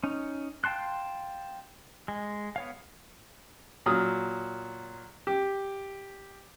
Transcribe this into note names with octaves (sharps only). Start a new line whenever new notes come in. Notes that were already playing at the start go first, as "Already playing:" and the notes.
C#4 D#4
F5 G5 A5 C6 F#6
G#3
B3 C#5 F5
A#2 F#3 D#6 F6
G4